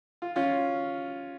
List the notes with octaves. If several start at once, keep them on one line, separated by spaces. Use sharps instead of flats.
F4
C#4 F4